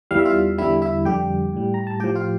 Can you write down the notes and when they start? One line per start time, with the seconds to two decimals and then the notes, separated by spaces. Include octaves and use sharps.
0.11 E2 E3 G3 F5
0.19 E5
0.25 F4 F5
0.58 E2 D3 G3 E4 E5
0.82 E4 E5
1.05 F2 D3 G3 G4 G5
1.53 A2 G3
1.74 A#5
1.87 A5
2.00 A2 F3 G4 G5
2.15 F4 F5